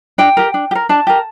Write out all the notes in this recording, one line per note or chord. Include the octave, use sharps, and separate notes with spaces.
D4 G5
G4 A#4
D4
G4
A#4
D4 A5
G4 A#4